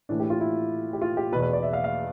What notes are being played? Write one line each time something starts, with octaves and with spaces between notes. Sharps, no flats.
A2 E3 D4
G4
F4
E4
G4
F4
G4
E2 B2 B4
B4
D5
E5
F5
F5